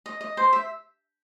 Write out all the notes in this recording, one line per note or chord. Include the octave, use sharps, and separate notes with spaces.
D#5
D#5
C5
E5